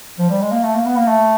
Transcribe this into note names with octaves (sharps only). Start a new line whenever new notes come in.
F3
G3
G#3
A#3
A3
A#3
B3
A#3
A3